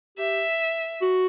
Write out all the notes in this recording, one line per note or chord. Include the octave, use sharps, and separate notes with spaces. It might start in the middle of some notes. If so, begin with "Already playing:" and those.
G4 E5
F#4